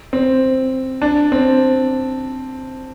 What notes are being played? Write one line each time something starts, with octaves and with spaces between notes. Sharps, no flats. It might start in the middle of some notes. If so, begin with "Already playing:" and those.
C4
D4
C4